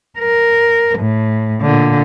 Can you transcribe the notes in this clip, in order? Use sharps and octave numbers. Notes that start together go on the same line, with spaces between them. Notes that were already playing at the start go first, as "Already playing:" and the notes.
A#4
A2
A#2 D3